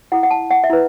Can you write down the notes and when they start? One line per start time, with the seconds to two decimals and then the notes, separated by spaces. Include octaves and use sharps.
0.12 E4 A4 F#5
0.23 F#5
0.31 A5
0.51 F#5
0.64 E5
0.70 E4 B4